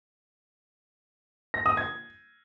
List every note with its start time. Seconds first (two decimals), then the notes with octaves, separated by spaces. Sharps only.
1.54 A#6
1.66 D#6
1.77 G#6